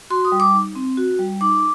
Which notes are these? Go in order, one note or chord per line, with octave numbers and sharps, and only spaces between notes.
F#4 C6
D#6
G3
D6
D#4
C4
F#4
G3
D#4 D6